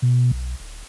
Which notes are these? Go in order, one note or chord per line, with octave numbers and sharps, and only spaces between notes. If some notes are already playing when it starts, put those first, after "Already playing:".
B2
B1
D1